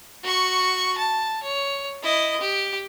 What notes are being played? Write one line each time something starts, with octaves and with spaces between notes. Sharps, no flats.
F#4 C#6
A5
C#5
E4 D#5
G4